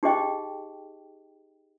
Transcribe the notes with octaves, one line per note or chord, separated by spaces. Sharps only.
D#4 G4 G#4 D#5 G5